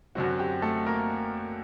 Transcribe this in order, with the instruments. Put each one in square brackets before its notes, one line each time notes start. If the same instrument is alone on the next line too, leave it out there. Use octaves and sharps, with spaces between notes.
[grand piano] F#2 D3 F#3 C4 F#4
G4
A3 A4
A#3 A#4